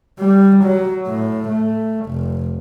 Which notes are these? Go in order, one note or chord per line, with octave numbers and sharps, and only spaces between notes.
G3
F#3
A2
A3
F1